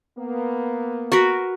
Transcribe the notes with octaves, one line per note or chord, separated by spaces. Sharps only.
A#3 B3
F#4 A#4 B4